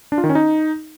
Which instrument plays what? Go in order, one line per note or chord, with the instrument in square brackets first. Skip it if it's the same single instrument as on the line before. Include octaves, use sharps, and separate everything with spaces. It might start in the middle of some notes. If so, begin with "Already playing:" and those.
[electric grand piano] D4
F4
D#3
C#4
D#4